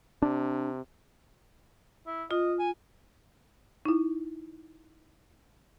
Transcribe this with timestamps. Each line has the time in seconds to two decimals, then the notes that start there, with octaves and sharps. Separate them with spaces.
0.22 C3 D4
2.07 E4
2.31 F4 D#5
2.59 G#5
3.85 D#4 E4